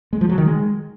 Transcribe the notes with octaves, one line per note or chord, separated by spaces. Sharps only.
G#3
F3
F#3
D#3
G#3